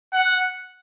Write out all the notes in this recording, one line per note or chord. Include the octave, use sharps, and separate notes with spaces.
F#5